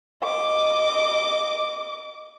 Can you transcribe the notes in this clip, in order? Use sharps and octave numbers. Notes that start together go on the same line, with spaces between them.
D#5 D6